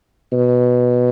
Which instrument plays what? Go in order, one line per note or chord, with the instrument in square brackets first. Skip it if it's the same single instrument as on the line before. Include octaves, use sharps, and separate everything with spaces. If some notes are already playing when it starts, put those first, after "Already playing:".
[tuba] B2